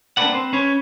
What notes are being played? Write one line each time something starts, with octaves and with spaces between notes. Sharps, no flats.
A#3 C4 D4 B4 D5 F#5
C4 B4 C5
C#4 B4 C#5